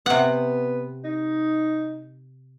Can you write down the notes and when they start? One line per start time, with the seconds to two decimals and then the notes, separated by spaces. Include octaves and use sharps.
0.06 C3 B3 F#5
1.04 D#4